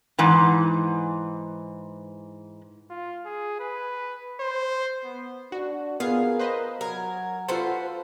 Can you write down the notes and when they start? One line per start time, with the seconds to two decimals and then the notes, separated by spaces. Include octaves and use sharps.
0.19 G#2 E3
2.90 F4
3.26 G#4
3.60 B4
4.40 C5
5.04 B3
5.52 D4 F#4
6.00 B3 F4 G#4 A#4 F5
6.39 B4 C5 D#5
6.81 F#3 A#4 G#6
7.48 F4 F#4 A4 B4 C5